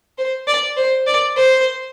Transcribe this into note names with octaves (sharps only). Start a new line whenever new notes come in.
C5
D5
C5
D5
C5